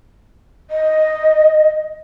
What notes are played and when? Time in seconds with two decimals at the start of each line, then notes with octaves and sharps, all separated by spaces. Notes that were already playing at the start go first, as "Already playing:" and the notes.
0.70 D#5